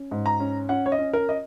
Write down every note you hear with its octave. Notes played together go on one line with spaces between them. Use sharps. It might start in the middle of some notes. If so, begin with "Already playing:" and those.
Already playing: C#4
G#2
A#5
C#4
C#4 F#5
C#5
D#5
C#4
A#4
D#5